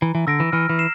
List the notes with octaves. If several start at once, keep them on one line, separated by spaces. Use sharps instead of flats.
E3 A#5
E3
D3 E6 A#6 D7
E3
E3 F6
E3
C7 E7